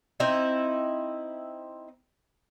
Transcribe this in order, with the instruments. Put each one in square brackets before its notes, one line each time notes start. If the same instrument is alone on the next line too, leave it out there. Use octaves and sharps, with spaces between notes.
[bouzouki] C4 D#4 E4 E5